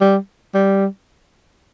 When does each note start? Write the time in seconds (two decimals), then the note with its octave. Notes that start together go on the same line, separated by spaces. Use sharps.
0.01 G3
0.54 G3